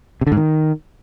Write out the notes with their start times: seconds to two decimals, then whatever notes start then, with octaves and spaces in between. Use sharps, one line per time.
0.21 C3
0.27 D3
0.32 G#2
0.37 D#3